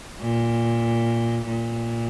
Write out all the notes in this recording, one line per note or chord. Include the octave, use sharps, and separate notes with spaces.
A#2
A#2